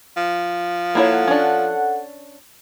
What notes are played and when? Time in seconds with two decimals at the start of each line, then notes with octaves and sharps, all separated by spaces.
0.17 F3
0.95 A#3 E4 A4 C#5 F#5
1.28 C#4 D4